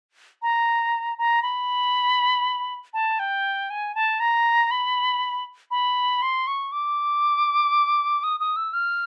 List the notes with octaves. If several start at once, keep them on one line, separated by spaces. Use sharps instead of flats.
A#5
A#5
B5
A5
G5
G#5
A5
A#5
B5
B5
C6
C#6
D6
D#6
D#6
E6
F6